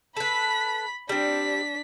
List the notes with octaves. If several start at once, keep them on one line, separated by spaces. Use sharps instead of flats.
A4 B4 B5 B6
G3 C4 D4 B6